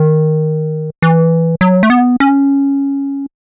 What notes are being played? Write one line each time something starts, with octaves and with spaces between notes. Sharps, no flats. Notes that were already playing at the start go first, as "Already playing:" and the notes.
Already playing: D#3
E3
F#3
A3
B3
C#4